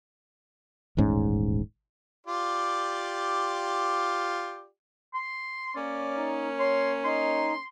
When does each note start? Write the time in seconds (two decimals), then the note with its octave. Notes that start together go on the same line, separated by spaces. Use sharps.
0.97 D#1 A1 G#2 C#4
2.27 F4 G4 D5
5.14 C6
5.75 A#3 C#4 D5
6.17 D#4
6.60 C#5 C6
7.05 D#4 C6